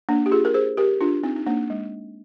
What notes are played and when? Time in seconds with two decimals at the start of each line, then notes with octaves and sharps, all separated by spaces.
0.09 A#3 D4
0.26 G4
0.31 F4 G#4
0.45 A#4
0.54 G#4 C5
0.77 G4 A#4
1.01 D4 F4
1.24 C4 D#4
1.36 D#4
1.46 A#3 D4
1.70 G#3